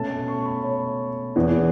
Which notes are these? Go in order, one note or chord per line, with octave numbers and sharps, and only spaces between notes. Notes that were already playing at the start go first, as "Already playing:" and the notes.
Already playing: B2 A3 C#4 A5
A5
C#6
B5
C#5
E2 E3 B3